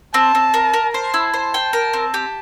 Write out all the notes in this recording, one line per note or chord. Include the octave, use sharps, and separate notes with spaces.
C4 A5
C4
A#4
A#4
C5 A5
E4
C5
G5
A#4
C4
G4